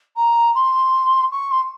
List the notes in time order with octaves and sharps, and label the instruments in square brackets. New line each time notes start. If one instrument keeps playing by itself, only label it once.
[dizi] A#5
C6
C#6
C6